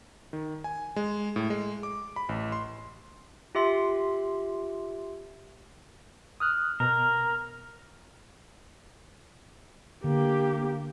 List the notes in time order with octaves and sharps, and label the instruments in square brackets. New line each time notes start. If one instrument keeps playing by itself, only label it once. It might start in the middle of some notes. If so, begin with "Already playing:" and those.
[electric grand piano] D#3
G#5
G#3
A2
G#3
D6
B5
A1
C6
[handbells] F4 G4 E5 C6
[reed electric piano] D#6 F6 F#6
[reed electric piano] B2 [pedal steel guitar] A#4
[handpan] D3 [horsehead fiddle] A#3 G4